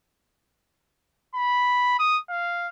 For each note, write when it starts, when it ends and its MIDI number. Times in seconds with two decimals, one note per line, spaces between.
1.35 1.95 83
1.99 2.18 87
2.30 2.69 77